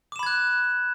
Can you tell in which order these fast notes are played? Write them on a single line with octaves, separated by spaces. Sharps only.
D6 E7 B5 G#6 F#6